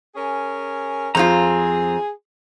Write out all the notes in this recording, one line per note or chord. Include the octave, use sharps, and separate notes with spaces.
C#4 G#4 A#4
F2 C4 F4 G#4 A#5